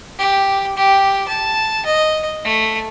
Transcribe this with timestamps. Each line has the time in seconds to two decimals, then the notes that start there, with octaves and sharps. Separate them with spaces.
0.19 G4
0.77 G4
1.28 A5
1.86 D#5
2.45 A3